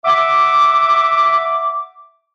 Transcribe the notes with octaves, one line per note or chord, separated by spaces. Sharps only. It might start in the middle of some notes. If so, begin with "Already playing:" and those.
E5 F#5 D6